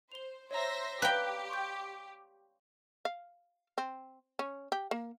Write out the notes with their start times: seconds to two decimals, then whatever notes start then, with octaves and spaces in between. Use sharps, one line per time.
0.12 C5 F7 G7
0.51 C5 C#5 E5 A#5 A#6
1.02 G4 B4 D5 F5 G5 A#5
1.49 C6 C#6 G6
3.05 F5
3.78 C4
4.39 C#4
4.72 G4
4.91 A#3